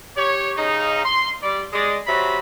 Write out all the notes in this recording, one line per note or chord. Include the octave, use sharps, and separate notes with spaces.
G4 C#5
C#3 D#4
C6
G3 D5
G#3 D5
C3 F#3 F#4 E5 B5